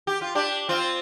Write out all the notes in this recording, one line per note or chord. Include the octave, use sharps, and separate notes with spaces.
G4
F4
D4 G4
C4 F4